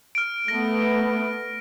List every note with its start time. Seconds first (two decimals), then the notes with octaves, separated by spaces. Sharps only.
0.15 F6 D7
0.48 A3 B3 A#6